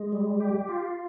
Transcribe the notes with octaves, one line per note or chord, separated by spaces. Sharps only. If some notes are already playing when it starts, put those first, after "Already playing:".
Already playing: G#3
G3
G4
F4